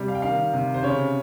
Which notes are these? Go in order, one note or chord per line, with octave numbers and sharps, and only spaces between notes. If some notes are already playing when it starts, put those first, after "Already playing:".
Already playing: C3 G3
F5
G5
D#3 F5
C3
C5
C#3 C#5